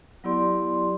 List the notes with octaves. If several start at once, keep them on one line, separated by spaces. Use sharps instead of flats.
F#3 B3 E4 G4 D5 C6